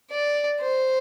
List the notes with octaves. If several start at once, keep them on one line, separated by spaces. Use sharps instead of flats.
D5
C5